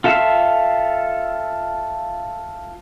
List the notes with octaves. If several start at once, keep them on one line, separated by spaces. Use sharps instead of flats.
F4 A4 E5 F5